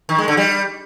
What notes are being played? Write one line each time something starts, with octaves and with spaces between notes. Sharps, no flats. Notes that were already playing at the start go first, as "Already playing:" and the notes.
D#3
G#3
D3
G3